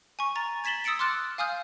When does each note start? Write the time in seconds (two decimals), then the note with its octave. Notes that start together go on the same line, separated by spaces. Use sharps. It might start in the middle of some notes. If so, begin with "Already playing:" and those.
0.19 G#5 C#6
0.36 A#5 A6
0.64 G#6 A6 B6 E7 F#7 G7
0.84 D#6 E6 A6 C#7 D7 E7
0.99 C6 D6 F6 F#6 A6
1.38 F5 G#5 D#6 F6 G6